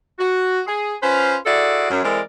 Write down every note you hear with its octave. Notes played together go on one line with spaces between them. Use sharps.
F#4
G#4
C#4 F4 B4 C5
E4 F#4 G#4 A4 D5
F#2 F#3
E3 G#3 C4 A4 A#4 D5